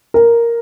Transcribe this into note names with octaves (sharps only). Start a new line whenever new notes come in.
A#4